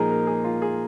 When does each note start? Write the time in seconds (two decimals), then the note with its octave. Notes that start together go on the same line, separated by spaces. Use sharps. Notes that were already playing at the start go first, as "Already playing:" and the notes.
Already playing: A#2 F3 G#3 D#4 G#4 A#4
0.11 A#4
0.27 G#4
0.44 F4
0.62 G#4